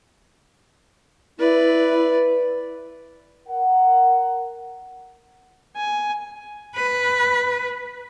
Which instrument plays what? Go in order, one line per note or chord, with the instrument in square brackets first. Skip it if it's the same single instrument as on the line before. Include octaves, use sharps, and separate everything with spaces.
[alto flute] E4 [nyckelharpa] B4 D5
[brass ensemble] A#4 F#5
[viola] G#5
[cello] B4